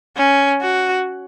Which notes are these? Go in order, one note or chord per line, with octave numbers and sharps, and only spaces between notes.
C#4
F#4